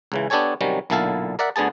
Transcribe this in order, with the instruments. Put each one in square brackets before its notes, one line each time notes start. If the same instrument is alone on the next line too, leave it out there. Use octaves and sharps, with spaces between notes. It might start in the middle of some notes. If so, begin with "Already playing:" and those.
[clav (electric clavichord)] C#2 C#3 E3
B3 D4 G4 A4 C#5 G#5
C3 D#3 F#3 G3 C#4
B1 A#2 D3 E4 A4 F5
A#4 D5 E5 F#5
D2 D3 B3 G#4 A5